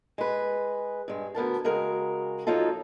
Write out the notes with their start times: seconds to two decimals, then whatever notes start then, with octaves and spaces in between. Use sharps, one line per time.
0.18 G#3 B4
1.08 G2 G#3
1.35 D2 B3 A#4 A5
1.64 C#3 G#3 F#4 A#4
2.47 F3 F#3 D#4 F4 A4